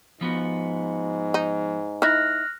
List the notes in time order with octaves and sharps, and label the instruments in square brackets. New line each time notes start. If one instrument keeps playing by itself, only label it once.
[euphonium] G#2 [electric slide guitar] F3 B3 F#4
[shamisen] D#4
[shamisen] D#4 E4 [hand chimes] F6 F#6 A#6